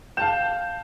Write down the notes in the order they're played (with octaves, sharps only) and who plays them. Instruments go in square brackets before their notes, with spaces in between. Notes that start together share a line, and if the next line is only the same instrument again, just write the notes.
[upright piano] F5 A5 E7 [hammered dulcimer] G5